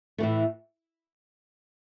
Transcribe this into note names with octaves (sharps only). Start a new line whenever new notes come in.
A2 E3 A3